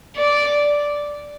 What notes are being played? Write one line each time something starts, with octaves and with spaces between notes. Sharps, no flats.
D5